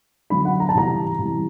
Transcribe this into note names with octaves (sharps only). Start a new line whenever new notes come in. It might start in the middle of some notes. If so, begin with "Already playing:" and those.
D3 F#3 B5
F#5
A#5
A5
C3 E3 G3 A#5
C3 E3 G3